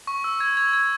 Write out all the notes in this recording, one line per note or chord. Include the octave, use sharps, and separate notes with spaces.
C#6
E6
G#6
G#6
G#6